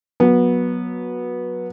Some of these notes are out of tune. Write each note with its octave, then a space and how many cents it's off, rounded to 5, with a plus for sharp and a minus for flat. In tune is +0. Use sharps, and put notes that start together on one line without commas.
F#3 -15 B3 -20